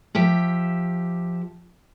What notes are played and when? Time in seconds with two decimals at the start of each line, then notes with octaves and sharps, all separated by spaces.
0.15 F3 G4 E5